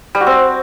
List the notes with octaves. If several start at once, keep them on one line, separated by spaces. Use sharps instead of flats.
G3
F#4
C4